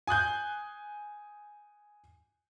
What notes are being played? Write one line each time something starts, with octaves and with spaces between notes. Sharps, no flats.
G#5 D#6 F#6 G6